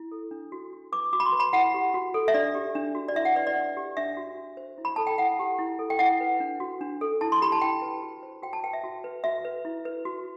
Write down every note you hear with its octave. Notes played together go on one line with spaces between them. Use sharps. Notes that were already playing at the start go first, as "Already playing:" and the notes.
Already playing: E4
A4
D4
F#4
F#4
B4 D6
F#4 D6
B5
C6
B4
B5
E4 F#5
G4
F#4
A4
E5
D4 D5
G4
D4
F#4
D5
E4 E5
F#5
B4 D5
D5
D4
G4
D4 E5
F#4
F#4
C5
E4
B5
A4 A5
G5
E4 F#5
G4
E4
A4
G5
E4 F#5
B4
D4
F#4
D4
A4
E4 A5
C6
G4 B5
A5
E4 G5
B4
F#4
C5
F#4 G5
A5
B4 G5
E5
F#4
B4
F#4 E5
B4
E4
B4
F#4